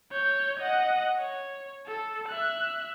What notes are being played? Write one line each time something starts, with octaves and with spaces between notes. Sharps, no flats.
C#5 G6
D#5 F#5
C#5
A4
E5 F#6